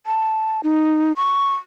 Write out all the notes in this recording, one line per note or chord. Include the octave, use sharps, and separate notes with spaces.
A5
D#4
C#6